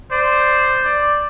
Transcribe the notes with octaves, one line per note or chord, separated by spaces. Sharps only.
C5 D5
D5